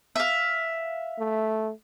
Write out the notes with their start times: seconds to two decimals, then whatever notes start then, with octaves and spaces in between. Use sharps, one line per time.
0.16 E5 F5
1.19 A3